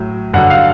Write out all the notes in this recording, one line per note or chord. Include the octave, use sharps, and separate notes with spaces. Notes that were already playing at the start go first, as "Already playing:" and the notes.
Already playing: A2 F#3
G2 D3 F#3 F#5
F5